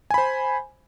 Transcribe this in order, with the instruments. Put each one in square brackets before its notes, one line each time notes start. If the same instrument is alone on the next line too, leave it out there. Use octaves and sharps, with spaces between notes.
[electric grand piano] G#5
B5
C5